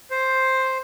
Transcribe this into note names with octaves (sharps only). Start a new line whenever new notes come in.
C5